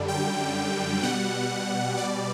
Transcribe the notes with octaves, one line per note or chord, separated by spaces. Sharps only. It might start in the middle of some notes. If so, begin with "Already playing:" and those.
Already playing: F#2 D3 G3
G5
B2 G3 F#5
D5